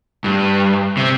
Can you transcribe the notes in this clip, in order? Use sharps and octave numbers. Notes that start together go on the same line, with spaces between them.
G2
C3